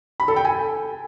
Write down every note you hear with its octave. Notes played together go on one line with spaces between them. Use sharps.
B5
A4
G5
G#5